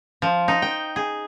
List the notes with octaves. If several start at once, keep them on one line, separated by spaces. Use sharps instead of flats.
F3
D#4
G5
G#4